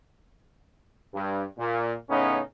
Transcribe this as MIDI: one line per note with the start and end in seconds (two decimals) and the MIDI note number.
1.14 1.44 43
1.58 1.93 46
2.09 2.40 45
2.09 2.40 49
2.09 2.40 59
2.09 2.40 61
2.09 2.40 63